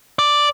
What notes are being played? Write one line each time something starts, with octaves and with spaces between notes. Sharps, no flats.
D5